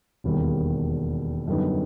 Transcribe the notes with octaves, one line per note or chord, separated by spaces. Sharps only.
E1 D#2 D#3 G3
F#2 D3 G3 B3 D#4